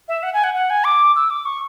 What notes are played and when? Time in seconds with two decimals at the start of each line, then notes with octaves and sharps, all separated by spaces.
0.08 E5
0.23 F#5
0.34 G#5
0.44 F#5
0.54 F#5
0.70 G#5
0.84 D6
1.16 E6
1.30 D6
1.45 C#6